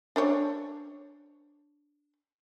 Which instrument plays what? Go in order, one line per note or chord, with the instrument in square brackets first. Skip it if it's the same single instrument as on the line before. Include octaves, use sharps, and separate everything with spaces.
[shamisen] D4 C5 C#5